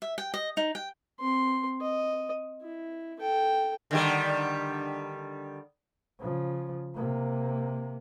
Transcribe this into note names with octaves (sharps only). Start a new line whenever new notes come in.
E5
G5
D#5
D#4
G5
C4 C6
D#5
E4
A4 G5
D3 D#3 G3
C#3 F3
C3 A#3